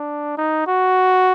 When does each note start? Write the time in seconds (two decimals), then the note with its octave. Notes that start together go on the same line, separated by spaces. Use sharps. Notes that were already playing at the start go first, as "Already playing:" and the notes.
Already playing: D4
0.38 D#4
0.67 F#4